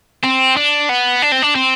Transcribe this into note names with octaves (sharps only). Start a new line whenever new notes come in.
C4
D4
B3
D4
C4
D4
C4